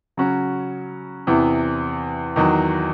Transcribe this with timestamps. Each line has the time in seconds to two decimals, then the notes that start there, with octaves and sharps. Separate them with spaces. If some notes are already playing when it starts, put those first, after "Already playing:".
0.17 C#3 F#3 C#4 F#4
1.27 E2 C3 E3
2.36 E2 D#3 F#3